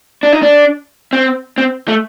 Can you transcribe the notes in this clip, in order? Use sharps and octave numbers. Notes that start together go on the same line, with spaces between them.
D4
D#4
D4
C4
C4
A3